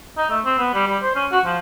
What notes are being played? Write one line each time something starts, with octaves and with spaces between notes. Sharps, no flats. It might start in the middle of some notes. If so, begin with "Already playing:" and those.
D#4
A3
C4
B3
G3
G3
C5
C#4
F#4
F3